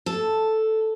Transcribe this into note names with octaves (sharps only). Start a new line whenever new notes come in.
A4